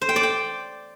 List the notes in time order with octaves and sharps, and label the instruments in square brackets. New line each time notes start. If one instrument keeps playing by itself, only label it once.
[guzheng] C5
G5
D5
G5